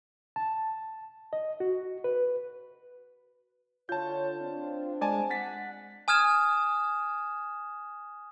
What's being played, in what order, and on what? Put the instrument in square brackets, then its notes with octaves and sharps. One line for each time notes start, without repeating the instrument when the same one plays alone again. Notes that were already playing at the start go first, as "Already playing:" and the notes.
[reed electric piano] A5
D#5
F#4
B4
[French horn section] D3 C#5 [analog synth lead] F4 [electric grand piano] A5 G6
[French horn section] C4 D4
[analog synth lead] G#3 [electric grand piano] D5 G#5 A5
[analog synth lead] F#5 [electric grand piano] A6 B6
[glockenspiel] G#5 D#6 F6 G#6 E7